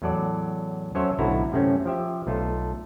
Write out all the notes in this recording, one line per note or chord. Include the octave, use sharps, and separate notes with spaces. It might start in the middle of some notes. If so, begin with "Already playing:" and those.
E2 A2 F#3 A4 D5
F#3 C#4 A4 C5 C#5 E5
B1 A2 D3 E4 F#4 A#5
F#2 C3 A3 C4 C#4
F3 G4 E5
B1 A3 F4 A4